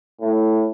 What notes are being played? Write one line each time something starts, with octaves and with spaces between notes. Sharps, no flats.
A2